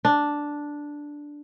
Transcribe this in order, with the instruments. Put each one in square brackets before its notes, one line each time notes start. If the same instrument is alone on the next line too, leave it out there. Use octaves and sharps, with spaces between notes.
[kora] D4